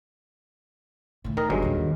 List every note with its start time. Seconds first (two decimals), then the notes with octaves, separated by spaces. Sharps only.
1.24 A2 C#3
1.37 A2 D#3 A#4 D#5
1.50 G1 G2 F#3 G#3
1.62 D#2 A#2